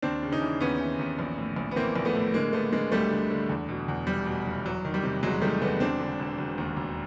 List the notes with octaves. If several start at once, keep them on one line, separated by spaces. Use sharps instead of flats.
D#2 C4 D4
C#3
C#4 D#4
E3
D#2 B3 C#4
E3
D#2
A#1
A2
A#1
B3
E3 A#3 C4
A#1
A3 B3
A2
D3 G#3 A#3
D3 A3 B3
D3 G#3 A#3
D2 G3 A3
D3
D3
E2
B2
E2
F1 G3
B2
F1
E2 F#3
D#3
G3
C3
E2 F#3 G#3
D#3 G3 A3
E2 A3 B3
E1 C4 D4
D3
E1
E1
D#2
E1